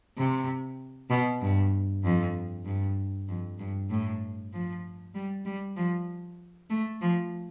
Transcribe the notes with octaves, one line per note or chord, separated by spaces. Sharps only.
C3
B2
G2
F2
G2
F2
G2
A2
F3
G3
G3
F3
A3
F3